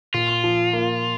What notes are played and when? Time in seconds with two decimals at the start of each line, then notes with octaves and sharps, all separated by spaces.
0.14 A#2 F4
0.44 F3
0.73 A#3